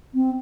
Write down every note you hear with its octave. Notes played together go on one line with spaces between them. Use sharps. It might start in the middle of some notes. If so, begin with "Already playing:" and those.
C4